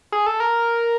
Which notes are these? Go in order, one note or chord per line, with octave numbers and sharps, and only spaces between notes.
G#4
A4
A#4